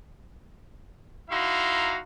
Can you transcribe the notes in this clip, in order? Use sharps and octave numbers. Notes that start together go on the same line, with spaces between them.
D#4 E4 F#4 F5 A#5 C6